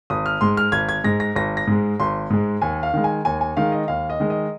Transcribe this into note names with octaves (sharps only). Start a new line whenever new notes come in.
G#1 D#6
F6
G#2 G#3 C6
F6
G#1 G#6
G#6
G#2 G#3 A#6
A#6
G#1 A#6
A#6
G#2 G#3
G#1 C6
G#2 G#3
D#2 G#5
F5
D#3 G#3
G#5
D#2 G#5
G#5
D#3 G#3 F5
D#5
D#2 F5
D#5
D#3 G#3
D#5